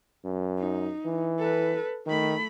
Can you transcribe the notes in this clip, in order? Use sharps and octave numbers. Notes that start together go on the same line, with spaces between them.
F#2
D#4
E3
A4 B4
D#3 A3 B5